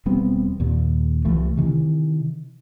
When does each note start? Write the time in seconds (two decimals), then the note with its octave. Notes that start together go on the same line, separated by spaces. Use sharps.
0.06 E1 G3 B3 C4
0.60 D#2 A#2
1.25 C2 E3 F3 A3
1.57 C3 D#3 E3